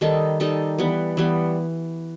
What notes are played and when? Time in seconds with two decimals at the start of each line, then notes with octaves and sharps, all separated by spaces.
0.01 D#3 G3 D#4 A4
0.40 D#3 G3 D#4 A4
0.78 E3 G3 B3
1.17 E3 G3 B3